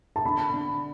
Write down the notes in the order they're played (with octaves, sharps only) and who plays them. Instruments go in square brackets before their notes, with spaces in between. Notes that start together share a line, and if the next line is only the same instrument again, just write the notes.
[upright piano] A5
[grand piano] D3 [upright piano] B5
[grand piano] D3